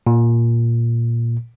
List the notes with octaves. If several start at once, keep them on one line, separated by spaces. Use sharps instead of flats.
A#2